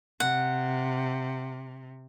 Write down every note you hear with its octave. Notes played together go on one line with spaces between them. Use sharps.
C3 F#5